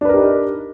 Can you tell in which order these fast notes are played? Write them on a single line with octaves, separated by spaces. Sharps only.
D4 B4 A#4 G4 D#4